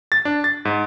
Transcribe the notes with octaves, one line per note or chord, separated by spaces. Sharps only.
A6
D4
A6
G#2